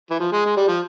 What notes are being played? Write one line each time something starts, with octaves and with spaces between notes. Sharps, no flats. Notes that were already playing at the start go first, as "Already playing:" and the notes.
E3
F3
G#3
G#3
G3
F3